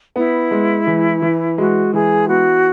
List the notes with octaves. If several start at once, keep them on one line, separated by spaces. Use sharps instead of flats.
B3 E4
G#3
E3
E3
G#3 F#4
E3 G#4
B3 F#4